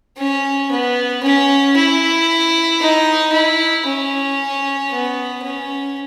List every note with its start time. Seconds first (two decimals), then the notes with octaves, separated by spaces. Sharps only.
0.17 C#4
0.71 B3
1.23 C#4
1.76 E4
2.81 D#4
3.33 E4
3.86 C#4
4.91 B3
5.43 C#4